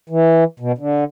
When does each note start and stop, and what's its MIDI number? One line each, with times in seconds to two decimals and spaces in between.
0.10 0.44 52
0.60 0.72 47
0.78 1.04 50